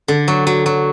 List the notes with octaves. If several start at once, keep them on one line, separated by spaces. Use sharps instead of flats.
D3
F#3
F#3
F#3